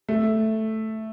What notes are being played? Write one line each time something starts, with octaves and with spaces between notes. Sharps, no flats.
A3